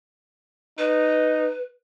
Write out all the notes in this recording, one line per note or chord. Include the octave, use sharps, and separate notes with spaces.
D#4 B4